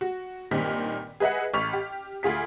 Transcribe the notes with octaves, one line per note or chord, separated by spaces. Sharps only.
F#4
G2 A#2 D#3 C4 B6
G#4 B4 D#5 E5 F#5
A1 C#6 F6 B6 F7
G4
D2 F4 G#4 B6